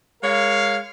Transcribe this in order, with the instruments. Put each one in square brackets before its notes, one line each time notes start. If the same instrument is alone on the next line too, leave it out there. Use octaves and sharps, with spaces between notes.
[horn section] G#3 A#4 C#5 F5